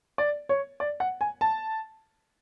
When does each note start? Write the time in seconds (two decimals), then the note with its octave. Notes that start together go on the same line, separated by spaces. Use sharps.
0.18 D5
0.49 C#5
0.80 D5
1.00 F#5
1.21 G#5
1.41 A5